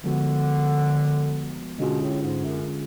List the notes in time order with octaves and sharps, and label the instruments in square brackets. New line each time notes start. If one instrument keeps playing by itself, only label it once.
[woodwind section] D3 [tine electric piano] F3 G#3 B3 F#4
[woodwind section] B2 [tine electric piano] D3 G#3 C#4 F4 G#4
[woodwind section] A2
G#2
F#2